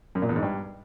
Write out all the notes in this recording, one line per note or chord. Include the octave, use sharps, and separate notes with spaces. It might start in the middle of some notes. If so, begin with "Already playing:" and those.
F#2
A#2
E2
G#2
G2